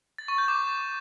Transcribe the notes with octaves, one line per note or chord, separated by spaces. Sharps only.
A6
C#6
G6
D6